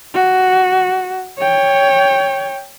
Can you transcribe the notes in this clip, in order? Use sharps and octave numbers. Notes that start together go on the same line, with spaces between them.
F#4
C#5 G5